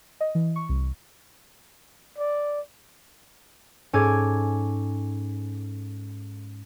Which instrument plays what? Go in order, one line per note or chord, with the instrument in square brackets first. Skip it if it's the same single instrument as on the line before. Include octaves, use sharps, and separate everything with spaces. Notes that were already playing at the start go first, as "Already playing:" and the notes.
[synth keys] D#5
E3
C#6
C2
[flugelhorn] D5
[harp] G#2 C#4 A4 G#5 D6 G#6